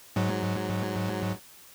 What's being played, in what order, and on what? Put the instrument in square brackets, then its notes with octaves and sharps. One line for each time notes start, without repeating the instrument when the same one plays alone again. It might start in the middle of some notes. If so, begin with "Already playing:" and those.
[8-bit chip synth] G#2 F#3